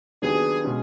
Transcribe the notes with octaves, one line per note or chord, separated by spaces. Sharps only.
D#2 D#3 F#3 B3 D4 G#4
B2 G#3 C#4